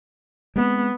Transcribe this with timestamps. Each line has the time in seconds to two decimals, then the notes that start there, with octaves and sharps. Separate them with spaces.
0.56 G#3 A3 B3 C4